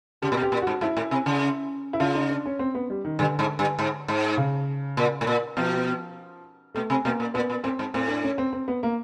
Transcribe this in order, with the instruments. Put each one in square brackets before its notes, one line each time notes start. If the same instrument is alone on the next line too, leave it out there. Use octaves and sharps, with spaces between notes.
[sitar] C#3 [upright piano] G4
[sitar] A#2
B2
[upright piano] G4
[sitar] A#2
[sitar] G#2 [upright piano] F#4
[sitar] G#2 [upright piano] E4
[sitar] A2
C3
C#3
[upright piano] E4
[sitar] C#3 [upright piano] F4
[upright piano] D#4
D4
C#4
C4
B3
G3
D#3
[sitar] G2 [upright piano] D3
[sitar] G#2
G2
G#2
G#2
[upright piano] C#3
[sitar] A#2
A2
A#2
[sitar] B2 [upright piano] F3
[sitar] B2 [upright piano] A3
[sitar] C3
[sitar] B2 [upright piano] A#3
[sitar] A#2
[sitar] A#2 [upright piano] B3
[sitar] A#2
[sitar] A2 [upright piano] C4
[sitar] G#2
[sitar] A2 [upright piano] C4
[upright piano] D4
C#4
C4
C4
B3
A#3